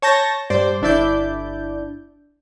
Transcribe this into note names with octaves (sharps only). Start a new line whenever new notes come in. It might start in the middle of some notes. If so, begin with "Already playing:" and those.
C#5 A5 G6 A#6
G2 C5 D5
G1 D4 E4 D5 G6